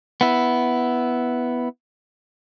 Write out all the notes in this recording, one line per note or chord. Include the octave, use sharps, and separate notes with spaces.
B3 E4